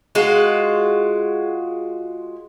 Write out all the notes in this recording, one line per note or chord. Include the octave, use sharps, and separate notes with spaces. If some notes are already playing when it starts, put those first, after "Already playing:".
G#3 F4 F#4